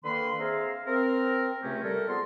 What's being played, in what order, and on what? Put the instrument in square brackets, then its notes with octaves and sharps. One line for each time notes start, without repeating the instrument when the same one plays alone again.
[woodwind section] D3 D#3 A#3 B4 C6
C4 G#4 E5 F5 A#5
C4 A#4
C#2 C3 A3 C#4 G4
G3 A4 A#4
F2 B3 G#4 A5 C6